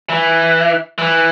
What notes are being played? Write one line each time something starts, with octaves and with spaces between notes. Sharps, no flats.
E3
E3